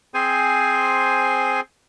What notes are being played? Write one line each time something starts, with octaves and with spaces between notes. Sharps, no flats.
C4 G#4 C5 G#5